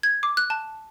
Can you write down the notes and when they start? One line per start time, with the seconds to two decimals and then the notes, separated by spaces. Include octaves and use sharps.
0.03 G#6
0.23 D6
0.37 F#6
0.50 A5